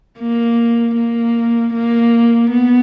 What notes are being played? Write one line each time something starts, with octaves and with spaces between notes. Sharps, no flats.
A#3
A#3
A#3
B3